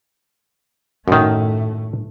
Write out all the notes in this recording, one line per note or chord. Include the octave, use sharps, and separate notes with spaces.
F#2 A2 D#3 A3